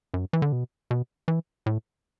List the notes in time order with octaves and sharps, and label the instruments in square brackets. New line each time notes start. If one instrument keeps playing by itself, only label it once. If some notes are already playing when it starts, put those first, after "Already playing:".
[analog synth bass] F#2
E3
D3
B2
B2
E3
A2